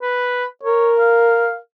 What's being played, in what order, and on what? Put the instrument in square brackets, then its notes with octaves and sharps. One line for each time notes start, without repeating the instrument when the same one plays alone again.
[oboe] B4
[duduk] A#4 [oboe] C#5
[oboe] F5